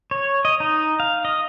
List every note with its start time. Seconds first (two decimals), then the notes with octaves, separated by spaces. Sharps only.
0.11 C#5
0.45 D#5
0.60 D#4
1.00 F5
1.25 D#5